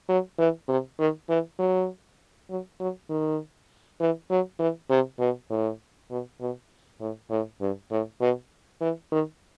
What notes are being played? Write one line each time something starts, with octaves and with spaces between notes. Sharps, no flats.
F#3
E3
C3
D#3
E3
F#3
F#3
F#3
D#3
E3
F#3
E3
C3
B2
A2
B2
B2
A2
A2
G2
A2
B2
E3
D#3